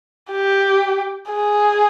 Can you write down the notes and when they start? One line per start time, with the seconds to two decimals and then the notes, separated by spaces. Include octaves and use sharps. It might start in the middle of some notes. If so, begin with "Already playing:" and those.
0.31 G4
1.30 G#4